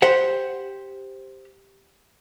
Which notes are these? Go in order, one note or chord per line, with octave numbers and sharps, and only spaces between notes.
G4 C5 F#5